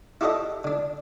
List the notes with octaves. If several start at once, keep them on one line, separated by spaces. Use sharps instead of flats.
E4 F#4 G4 A4 C5 D#5
D3 D4